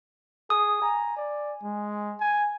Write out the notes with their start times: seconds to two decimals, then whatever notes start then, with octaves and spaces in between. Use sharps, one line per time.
0.50 G#4 D#6
0.82 G#5 A#5
1.16 D5
1.63 G#3
2.20 G#5